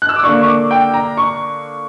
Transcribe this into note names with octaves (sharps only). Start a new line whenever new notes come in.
F#6
E6
D6
D3 A#3 D4 C#6
C#6
D6
G5
A#5
C#6